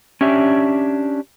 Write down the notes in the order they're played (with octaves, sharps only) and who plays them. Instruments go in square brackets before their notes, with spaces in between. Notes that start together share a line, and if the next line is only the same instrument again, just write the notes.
[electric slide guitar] C#4 D4 G4 E5